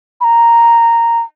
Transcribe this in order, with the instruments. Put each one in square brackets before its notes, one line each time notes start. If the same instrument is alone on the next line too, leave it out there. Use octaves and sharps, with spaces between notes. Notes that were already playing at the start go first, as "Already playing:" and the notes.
[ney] B5
A#5